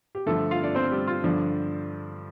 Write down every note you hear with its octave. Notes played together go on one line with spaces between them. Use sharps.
G4
G2 D3 F3 A3 A4
F4 F5
D4 D5
C4 C5
G3 G4
F4
G2 D3 F3 D4